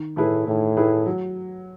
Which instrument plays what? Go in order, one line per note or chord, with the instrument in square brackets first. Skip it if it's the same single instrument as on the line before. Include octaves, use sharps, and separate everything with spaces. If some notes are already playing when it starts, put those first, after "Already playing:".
Already playing: [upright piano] D#3
[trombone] A2 [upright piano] A3 E4 G#4 B4
[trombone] A2 [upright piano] D#3
[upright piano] A3 E4 G#4 B4
F#3